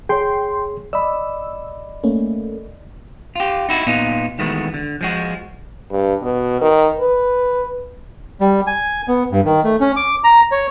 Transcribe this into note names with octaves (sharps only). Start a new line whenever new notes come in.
G#4 C#5 G5 C6
D5 D#5 B5 E6
A3 A#3 C#4
F4 G4
D#4 E4 F#4
A#2 B3 D#4 F4
D#3 E3 G#3 A3 B3 F#4
D3
F3 G#3 F#4
G2
B2
D#3
B4
G3
G#5
B3
G2
D#3
A3
C#4
D6
A#5
C#5